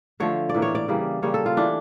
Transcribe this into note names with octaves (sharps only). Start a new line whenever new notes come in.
D3 F3 A3 C#5
D5
A2 E3 A#3
C#5
D5
C#3 E3 G3 A#3
C#3 G3 A#3 C#5
A4
F4
E3 A3 D4